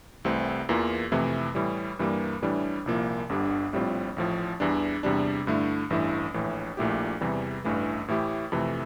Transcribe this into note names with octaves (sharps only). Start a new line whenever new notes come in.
C2 C3 E3 A3 C4
E2 E3 A#3 F4
F2 C3 E3 A3 E4
A2 E3 G3
G2 E3 G3 A#3
A2 E3 G3 D4
C2 A#2 F3 A#3 E4
G1 G2 D3 G3 D4
A#1 A2 G3 C4 F4
A1 A2 F3
E2 E3 G3 D4
E2 C3 G3 D4
G2 D3 A3 E4
A1 G2 E3 A3 E4
A#1 A2 E3
A#1 A#2 A3 E4 G4
E2 C3 E3 G3
A1 G2 E3 A3
A2 E3 A3 E4 G4
F2 C3 E3 A3